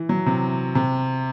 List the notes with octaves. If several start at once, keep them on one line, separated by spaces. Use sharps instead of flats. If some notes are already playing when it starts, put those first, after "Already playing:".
Already playing: E3
F#3
C3
C3